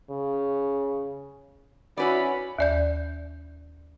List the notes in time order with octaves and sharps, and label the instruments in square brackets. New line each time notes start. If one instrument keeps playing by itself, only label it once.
[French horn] C#3
[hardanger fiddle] C#4 [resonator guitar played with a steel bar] E4 B4 D5 [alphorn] F#4 [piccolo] B5
[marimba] D#2 D5 G6